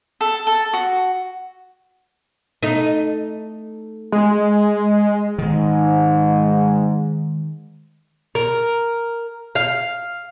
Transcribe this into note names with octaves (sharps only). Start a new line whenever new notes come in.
A4
A4
F#4
A3 D#4
G#3
G#2 D#3 G#3
A#4
F5